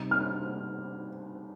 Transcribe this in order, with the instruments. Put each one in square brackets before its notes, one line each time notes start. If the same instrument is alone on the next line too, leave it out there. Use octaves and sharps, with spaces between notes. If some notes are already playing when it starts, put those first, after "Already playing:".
Already playing: [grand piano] C3 G3 C4 D#4
[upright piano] F6